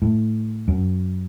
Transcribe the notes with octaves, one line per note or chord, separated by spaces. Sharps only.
A2
F#2